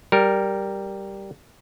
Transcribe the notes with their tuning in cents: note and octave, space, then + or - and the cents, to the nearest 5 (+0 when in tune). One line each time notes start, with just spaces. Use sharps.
G3 +0 A#4 +0